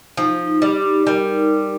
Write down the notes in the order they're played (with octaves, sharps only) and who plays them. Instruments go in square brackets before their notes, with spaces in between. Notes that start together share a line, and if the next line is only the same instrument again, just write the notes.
[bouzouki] F3 [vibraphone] D#4
[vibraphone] D#4
[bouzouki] G3
[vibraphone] D#4
[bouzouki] G3 [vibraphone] A#4
[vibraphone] D#4